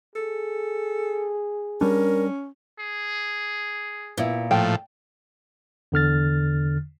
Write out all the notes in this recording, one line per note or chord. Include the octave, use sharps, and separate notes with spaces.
G#4 A4
G3 C#4 D4 A#4
G#4
A#2 B3 E4
A2 F3 G5
E2 D3 F6 A6